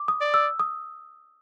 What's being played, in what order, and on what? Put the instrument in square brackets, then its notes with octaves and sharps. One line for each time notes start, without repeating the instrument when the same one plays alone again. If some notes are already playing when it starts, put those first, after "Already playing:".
Already playing: [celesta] D6
D#6
[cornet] D5
[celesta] E6
D#6